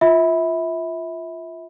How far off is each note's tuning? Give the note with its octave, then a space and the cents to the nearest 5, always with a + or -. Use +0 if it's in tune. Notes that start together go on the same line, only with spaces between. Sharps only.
F4 +0 E5 -25 B5 +0